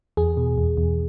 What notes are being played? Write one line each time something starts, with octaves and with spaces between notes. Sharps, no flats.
E2 G#4
B2
E2
E2